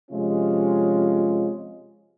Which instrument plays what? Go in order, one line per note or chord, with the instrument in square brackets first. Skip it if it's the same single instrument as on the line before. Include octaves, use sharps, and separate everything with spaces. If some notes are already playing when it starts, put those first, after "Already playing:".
[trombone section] C3 F3 G#3 C#4 F4